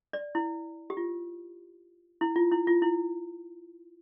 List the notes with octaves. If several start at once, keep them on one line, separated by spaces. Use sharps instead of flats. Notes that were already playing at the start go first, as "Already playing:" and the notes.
D5
E4
G4
F4
E4
F4
E4
F4
E4